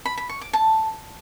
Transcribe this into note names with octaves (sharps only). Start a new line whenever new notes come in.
B5
B5
C#6
D6
A5